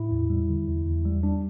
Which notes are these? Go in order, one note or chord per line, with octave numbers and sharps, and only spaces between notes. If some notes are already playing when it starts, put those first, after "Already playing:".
Already playing: A2 E4
E2
G3
D3
E2
E2
G3
G3 D4